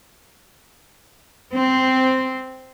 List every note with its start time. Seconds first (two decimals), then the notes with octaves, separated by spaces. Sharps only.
1.54 C4